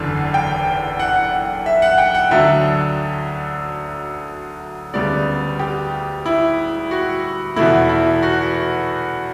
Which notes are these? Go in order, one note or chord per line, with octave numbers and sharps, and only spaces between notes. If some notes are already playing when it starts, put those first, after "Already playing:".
Already playing: F#1 E2 D3
G5
F#5
E5
F#5
G5
F#5
D2 D3 F#3 E5
D2 C#3 G3 B3 D5
G4
E4
F#4
E2 B2 A3 E4
E4
F#4